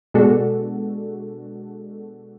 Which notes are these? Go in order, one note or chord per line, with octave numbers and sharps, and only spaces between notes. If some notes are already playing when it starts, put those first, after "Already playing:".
B2 G#3 D4 F#4 A4